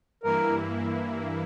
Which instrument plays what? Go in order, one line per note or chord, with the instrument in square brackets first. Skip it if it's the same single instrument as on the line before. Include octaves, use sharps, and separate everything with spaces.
[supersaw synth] G2 E3 A#3 E4 [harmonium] A#4